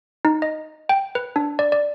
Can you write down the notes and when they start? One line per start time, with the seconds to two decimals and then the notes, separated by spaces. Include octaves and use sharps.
0.25 D#4
0.42 D#5
0.89 G5
1.15 B4
1.36 D4
1.59 D5
1.72 D5